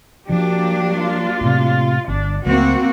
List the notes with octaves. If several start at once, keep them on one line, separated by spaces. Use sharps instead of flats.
F3 F#3 A#3 D4 G4
F4
A2 C3
G1 D4
C#2 F#3 A3 A#3 C4 F#4 F#5